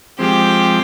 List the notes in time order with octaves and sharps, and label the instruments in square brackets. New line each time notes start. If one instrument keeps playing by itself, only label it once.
[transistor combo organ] F3 G#3 C4 [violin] G4